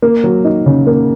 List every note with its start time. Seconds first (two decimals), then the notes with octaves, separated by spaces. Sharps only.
0.02 A#3
0.24 F#3
0.44 D#4
0.66 C#3
0.87 A#3